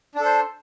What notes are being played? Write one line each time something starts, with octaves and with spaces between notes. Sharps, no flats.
D4 A4 C5